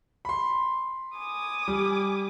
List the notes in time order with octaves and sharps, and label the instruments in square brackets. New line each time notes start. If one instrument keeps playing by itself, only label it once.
[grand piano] B5 C6
[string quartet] G#5 D6 D#6
[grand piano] G3